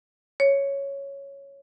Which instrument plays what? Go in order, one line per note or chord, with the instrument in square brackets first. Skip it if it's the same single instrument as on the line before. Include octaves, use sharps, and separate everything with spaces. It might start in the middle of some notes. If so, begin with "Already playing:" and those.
[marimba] C#5